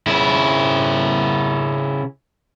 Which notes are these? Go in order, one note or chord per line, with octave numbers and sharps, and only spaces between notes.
C#3 E4